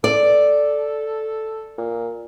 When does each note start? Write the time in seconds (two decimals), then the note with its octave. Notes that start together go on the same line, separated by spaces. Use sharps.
0.04 A4 D5
1.78 A#2